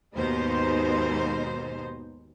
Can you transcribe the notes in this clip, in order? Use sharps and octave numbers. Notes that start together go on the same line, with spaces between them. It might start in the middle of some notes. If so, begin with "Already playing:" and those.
D#2 G#2 B2 G#3 D#4 C5